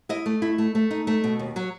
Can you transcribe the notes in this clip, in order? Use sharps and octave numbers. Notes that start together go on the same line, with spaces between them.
E4 D#5
A3
E4
A3
A3
D#4
A3
B2
D#2
F#3